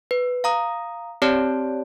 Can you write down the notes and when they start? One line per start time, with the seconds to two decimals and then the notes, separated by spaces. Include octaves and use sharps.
0.11 B4
0.44 F5 A#5 D#6
1.22 C4 G4 C#5 D5 A5